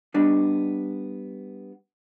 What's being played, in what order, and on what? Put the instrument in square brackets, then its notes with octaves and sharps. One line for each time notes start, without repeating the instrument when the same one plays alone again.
[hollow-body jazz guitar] G3 B3 D4 D#4